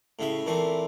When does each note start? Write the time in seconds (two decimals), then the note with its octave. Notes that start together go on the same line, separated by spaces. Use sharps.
0.19 A2 C#3 E5
0.46 A#2 E3 A3 C4